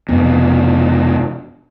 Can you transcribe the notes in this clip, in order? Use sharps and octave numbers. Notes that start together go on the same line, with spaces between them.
F1 B2